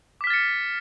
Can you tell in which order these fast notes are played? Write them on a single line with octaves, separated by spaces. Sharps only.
D6 B6 F6 A6 C#7